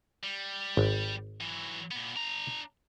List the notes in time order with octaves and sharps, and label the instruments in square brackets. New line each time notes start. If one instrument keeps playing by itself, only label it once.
[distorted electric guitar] G3
[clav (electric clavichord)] G#1
[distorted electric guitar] E3 F#3
A#2 B3
D4 A#5